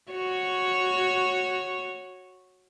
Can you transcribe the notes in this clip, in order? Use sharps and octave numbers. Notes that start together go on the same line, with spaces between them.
F#4 C#5